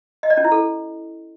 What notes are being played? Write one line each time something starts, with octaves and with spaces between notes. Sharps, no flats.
D#5
D5
C#4
E4
A4